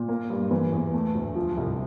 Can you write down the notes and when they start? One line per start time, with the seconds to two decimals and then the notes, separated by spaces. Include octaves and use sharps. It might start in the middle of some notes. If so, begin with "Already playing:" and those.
Already playing: A#2
0.08 A#3
0.30 G2
0.51 E3
0.72 E2
0.94 A3
1.15 D2
1.35 F3
1.57 C2